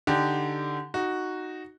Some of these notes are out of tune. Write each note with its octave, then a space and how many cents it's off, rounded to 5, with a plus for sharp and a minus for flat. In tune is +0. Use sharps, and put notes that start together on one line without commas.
D3 +0 D#4 +0 G4 +0
D#4 +0 F#4 +0